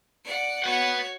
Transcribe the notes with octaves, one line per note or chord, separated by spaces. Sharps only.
D5 F#5
F#4 B4 C#5 F#5